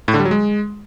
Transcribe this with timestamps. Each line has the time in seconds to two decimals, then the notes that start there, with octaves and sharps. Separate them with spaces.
0.08 A2
0.14 D3
0.20 G3
0.25 F#3
0.31 G#3